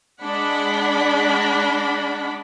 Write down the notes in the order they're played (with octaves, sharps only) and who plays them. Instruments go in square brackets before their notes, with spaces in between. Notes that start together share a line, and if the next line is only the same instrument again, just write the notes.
[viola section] G#3 D4 D5 F#5 B5